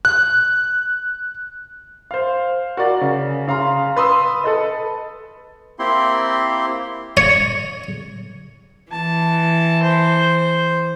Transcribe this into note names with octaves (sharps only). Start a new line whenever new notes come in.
F#6
C5 F5
F#4 A#4 D5
C#3
C#3 F5 A#5 C6
B4 C6 D#6 E6
A4 B4 D#5
A#3 C4 E4 G4 C6
C#5
E3 A5
C5